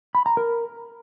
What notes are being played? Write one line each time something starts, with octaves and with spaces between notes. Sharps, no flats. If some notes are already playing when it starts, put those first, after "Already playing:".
B5
A#5
A#4